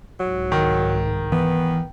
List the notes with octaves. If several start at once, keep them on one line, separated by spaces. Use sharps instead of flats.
C2 G#2 F#3
D#3
E3 B3